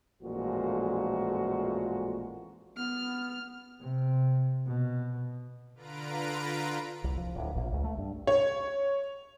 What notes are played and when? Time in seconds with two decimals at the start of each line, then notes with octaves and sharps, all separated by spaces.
0.22 A1 F2 A#2 F3 G#3 F#4
2.77 B3 F6
3.81 C3
4.66 B2
5.74 D3 F4 B4 A#5 D7
7.04 C2
7.17 F3
7.36 D1
7.56 A#1
7.72 C#2
7.84 A3
7.98 G2
8.27 C#5